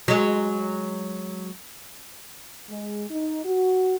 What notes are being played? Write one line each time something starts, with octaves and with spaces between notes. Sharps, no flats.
F#3 G#3
G#3
D#4
F#4